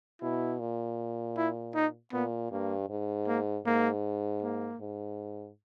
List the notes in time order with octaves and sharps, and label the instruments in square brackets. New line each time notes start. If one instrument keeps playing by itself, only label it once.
[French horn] B2 [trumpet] E4
[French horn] A#2
[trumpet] E4
D#4
[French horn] A#2 [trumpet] B3
[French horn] G2 [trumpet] A#3
[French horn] G#2
[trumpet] A#3
[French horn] G#2 [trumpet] A#3
[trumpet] A#3
[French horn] G#2